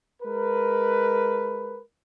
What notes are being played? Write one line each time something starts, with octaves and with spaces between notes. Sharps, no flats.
G#3 A#4 B4